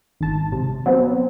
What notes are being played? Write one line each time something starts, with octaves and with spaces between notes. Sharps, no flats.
G#1 A5
C3
F#3 B3 C4